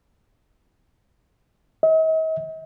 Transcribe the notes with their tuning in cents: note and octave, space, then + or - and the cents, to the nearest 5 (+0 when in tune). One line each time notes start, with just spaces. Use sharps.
D#5 +45